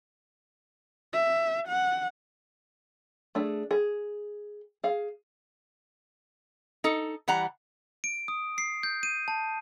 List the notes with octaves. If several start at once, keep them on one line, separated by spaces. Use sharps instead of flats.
E5
F#5
A3 D4 G#4
G#4
G#4 F5
D#4 A4
E3 G3 F#5 A#5
D7
D#6
C7
G6
D#7
A5